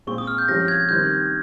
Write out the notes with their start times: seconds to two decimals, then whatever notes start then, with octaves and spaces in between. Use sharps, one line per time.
0.07 A#2 G#3 C4 C#6
0.18 D#6
0.27 F6
0.38 G6
0.48 C2 C3 F3 G#3 C#4 A#6
0.68 G#6
0.89 D#3 G3 C4 D#4 G6